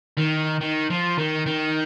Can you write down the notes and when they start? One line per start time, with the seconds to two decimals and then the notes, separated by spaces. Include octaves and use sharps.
0.18 D#3
0.61 D#3
0.90 F3
1.18 D#3
1.46 D#3